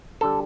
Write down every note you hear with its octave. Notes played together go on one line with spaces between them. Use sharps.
D3 G3 A4